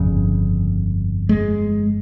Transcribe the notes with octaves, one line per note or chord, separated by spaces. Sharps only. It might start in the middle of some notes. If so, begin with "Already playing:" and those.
Already playing: G1 F2 C#3
G#3